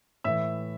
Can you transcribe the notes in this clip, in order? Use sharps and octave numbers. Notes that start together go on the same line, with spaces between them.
A2 E3 E5 E6